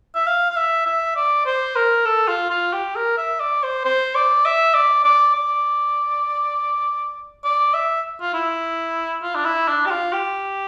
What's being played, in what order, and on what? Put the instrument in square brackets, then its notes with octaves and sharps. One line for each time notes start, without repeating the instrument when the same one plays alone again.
[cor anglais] E5
F5
F5
E5
E5
D5
C5
A#4
A4
F4
F4
G4
A#4
E5
D5
C5
C5
D5
E5
D5
D5
D5
D5
E5
F4
E4
F4
D4
E4
D4
G4
F4
G4